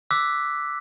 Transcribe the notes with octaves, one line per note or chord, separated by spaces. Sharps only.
D6 E6 F#6 B6